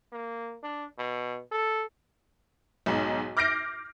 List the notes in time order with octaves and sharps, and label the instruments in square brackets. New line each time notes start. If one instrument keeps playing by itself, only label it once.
[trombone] A#3
D4
B2
A4
[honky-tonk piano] B1 G#2
D6 F6 G6 A#6 C7 D7